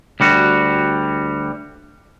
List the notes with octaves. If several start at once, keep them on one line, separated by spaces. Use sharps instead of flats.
D2 G3 F#4